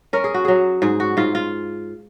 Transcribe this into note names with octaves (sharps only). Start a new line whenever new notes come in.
C#4 A#4
G#4
F#4
F#3 G#4
G#2 G#4
F#4
G#2 F4
F4